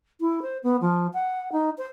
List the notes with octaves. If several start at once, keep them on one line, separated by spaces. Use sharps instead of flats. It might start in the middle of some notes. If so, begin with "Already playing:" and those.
E4
C5
B3
F3
F#5
D#4
C5